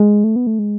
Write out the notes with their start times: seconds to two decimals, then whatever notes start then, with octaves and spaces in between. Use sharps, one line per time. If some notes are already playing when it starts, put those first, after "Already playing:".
Already playing: G#3
0.24 A3
0.36 B3
0.47 A3
0.59 G#3